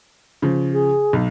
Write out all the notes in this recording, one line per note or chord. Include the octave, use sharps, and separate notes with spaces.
C#3 F3
G#4
B1